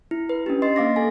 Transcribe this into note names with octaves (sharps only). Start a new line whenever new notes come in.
E4
B4
C#4 D4 G4
D#5 C6 A6 C7
A#3 F5 D6 A#6
A4 G#5